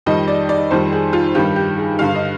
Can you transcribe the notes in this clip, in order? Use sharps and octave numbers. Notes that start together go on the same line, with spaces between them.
F2 D#3 G3 D#5
D5
D5
F2 D#3 G3 C5
G#4
F4
G2 D#3 G3 G4
G4
G#4
G2 D3 G3 F5
D#5